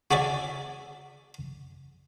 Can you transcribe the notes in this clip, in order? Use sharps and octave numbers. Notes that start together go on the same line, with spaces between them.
F#4 G#4 D5 E5